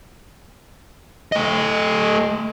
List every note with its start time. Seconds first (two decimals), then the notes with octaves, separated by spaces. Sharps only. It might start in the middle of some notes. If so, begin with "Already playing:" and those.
1.32 A3 D#5